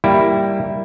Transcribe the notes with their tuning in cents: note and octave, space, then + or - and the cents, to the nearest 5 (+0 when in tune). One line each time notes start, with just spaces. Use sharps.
G3 +0 A#3 +0 E4 +0